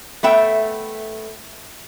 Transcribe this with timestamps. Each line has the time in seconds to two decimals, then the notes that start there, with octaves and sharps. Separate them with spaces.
0.23 A3 B3 E5 G5